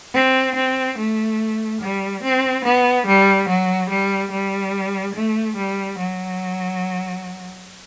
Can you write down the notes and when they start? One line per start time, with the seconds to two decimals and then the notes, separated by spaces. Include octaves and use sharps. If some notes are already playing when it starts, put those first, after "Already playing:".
0.14 C4
0.56 C4
0.98 A3
1.81 G3
2.23 C4
2.65 B3
3.07 G3
3.48 F#3
3.90 G3
4.32 G3
5.15 A3
5.57 G3
5.98 F#3